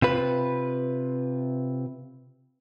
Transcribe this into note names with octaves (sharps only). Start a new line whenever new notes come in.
C3 F4 B4